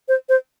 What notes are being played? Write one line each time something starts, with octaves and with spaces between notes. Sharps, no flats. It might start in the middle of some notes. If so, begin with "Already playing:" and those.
C5
C5